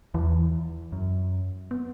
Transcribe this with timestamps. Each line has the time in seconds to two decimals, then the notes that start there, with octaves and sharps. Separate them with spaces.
0.14 E2 E3
0.92 F#2
1.71 B3